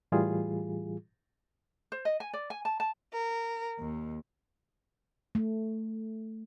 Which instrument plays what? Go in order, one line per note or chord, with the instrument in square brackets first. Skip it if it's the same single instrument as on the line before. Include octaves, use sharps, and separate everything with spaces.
[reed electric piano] A2 E3 G3 F4 G#4
[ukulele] C5
D#5
G#5
D5
G#5
A5
A5
[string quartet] A#4
D#2
[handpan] A3